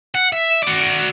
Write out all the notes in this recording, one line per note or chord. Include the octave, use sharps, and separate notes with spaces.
F#5
E5
F#4 D5